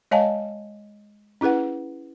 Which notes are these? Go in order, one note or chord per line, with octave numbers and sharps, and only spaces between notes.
G#3 C#5 D#5 F5 G#5 A5
C#4 E4 G#4 B4 F#5